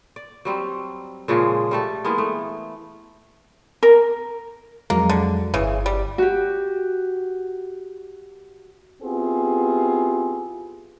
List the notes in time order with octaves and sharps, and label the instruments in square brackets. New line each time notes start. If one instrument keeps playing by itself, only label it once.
[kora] D5
F#3 G3 C4
A#2 C#3 F3 G#3
G3 A3 A4
E3 G#3 A#3 B3
A3
[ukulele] A#4
[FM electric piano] F2 F#3 G#3 [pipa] A#3
[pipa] D3
[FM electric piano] G1 [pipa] C#3 E3
[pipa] G3
[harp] F#4 G4
[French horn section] B3 C4 E4 F4 G4 G#4